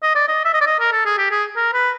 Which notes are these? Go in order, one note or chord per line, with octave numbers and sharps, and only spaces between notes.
D#5
D5
D#5
E5
D#5
D5
D#5
A#4
A4
G#4
G4
G#4
A#4
B4